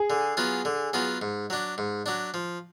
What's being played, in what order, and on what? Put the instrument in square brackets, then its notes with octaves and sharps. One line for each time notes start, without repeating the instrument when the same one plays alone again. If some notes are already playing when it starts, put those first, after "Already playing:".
Already playing: [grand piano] G#4
[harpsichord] D3
F#3 B3 F4
D3
F#3 B3 F4
G#2
F#3 D4
G#2
F#3 D4
F3